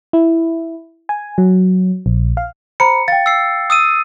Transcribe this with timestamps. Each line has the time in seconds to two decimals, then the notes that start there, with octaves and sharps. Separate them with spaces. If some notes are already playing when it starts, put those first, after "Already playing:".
0.13 E4
1.09 G#5
1.38 F#3
2.06 A#1
2.37 F5
2.80 C5 A#5 B5 C#7
3.08 F5 G5 A6
3.26 E6 C7
3.70 D#6 E6 D#7